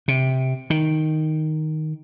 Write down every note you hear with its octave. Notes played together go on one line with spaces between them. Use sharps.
C3
D#3